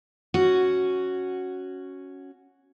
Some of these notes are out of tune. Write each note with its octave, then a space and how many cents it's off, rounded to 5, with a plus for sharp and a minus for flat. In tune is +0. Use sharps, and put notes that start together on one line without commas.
C#4 +0 F#4 +0